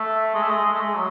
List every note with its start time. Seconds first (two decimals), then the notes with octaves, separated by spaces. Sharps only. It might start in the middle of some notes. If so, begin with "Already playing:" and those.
Already playing: A3
0.34 G#3
0.42 A3
0.49 G#3
0.65 G#3
0.73 A3
0.80 G#3
0.94 F#3